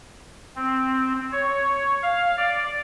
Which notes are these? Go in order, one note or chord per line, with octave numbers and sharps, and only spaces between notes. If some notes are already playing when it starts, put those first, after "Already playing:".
C4
C#5
F5
D5